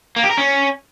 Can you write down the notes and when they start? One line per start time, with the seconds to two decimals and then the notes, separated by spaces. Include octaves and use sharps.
0.16 A#3
0.23 G4
0.30 A#4
0.37 C#4